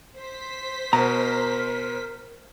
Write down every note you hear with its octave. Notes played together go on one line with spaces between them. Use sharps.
C5 B6
B2 A#4 A#5